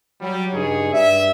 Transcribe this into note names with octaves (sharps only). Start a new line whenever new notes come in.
F#3 G3
G2 C#3 D#4 G#4 C#5
G2 D5 E5